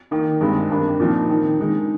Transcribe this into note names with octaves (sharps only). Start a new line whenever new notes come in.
D#3 A#3 D#4
G2 D#3 G#3 C4
G2 D#3 A#3 D4
A#2 F3 C4 D#4
D#3 A#3 D#4
D3 G#3 D#4